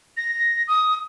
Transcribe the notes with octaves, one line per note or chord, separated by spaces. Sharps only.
A#6
D#6